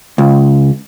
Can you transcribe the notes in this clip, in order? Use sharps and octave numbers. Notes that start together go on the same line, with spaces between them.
C#2